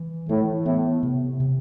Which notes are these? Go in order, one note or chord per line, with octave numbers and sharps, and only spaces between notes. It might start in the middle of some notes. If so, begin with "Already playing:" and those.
Already playing: E3
A2 E3
A2 B3
C3
C3